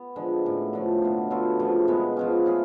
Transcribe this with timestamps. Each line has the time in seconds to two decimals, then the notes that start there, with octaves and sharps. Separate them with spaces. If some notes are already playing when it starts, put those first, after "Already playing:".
Already playing: B3
0.16 D3 F3 G#3
0.45 A2 F#3 C#4
0.73 D3 F3 A3
1.02 B2 F#3 B3 F4
1.31 F#3 B3 F4 A4
1.60 C#3 F3 A3
1.88 B2 G#3 B3
2.17 F3 G#3 C#4
2.45 A3 C#4 G#4